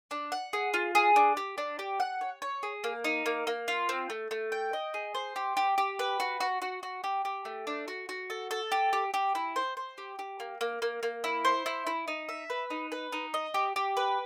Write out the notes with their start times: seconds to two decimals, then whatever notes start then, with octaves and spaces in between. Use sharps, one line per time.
0.11 D4
0.32 F#5
0.53 G#4
0.74 F4
0.95 G#4
1.16 D4
1.37 G4
1.58 D4
1.79 G4
2.00 F#5
2.21 C#5
2.42 C#5
2.63 G#4
2.84 A#3
3.04 D#4
3.26 A#3
3.47 A#3
3.68 F4
3.89 C4
4.10 A3
4.31 A3
4.52 G5
4.73 D#5
4.94 G#4
5.15 C5
5.36 G4
5.57 G4
5.78 G4
5.99 B4
6.20 F#4
6.40 F#4
6.62 F#4
6.83 F#4
7.04 G4
7.25 G4
7.45 A3
7.67 D4
7.88 F#4
8.09 F#4
8.30 A4
8.51 A4
8.72 G4
8.93 G4
9.14 G4
9.35 E4
9.56 C5
9.77 C5
9.98 G4
10.19 G4
10.40 A#3
10.61 A#3
10.82 A#3
11.03 A#3
11.24 E4
11.45 C5
11.66 E4
11.87 E4
12.08 D#4
12.29 E5
12.50 B4
12.70 D#4
12.92 B4
13.12 D#4
13.34 D#5
13.54 G4
13.76 G4
13.97 B4